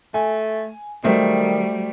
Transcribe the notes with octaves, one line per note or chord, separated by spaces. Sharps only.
A3 G#5
D#3 F#3 G3 A3 C5